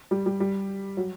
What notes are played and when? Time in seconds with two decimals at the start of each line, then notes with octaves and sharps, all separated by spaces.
0.11 G3
0.26 G3
0.40 G3
0.97 F#3